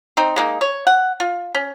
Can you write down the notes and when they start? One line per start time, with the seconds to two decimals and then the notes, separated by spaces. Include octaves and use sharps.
0.17 C4 D#4
0.36 G#3 A#3 D#4
0.61 C#5
0.87 F#5
1.20 F4
1.55 C#4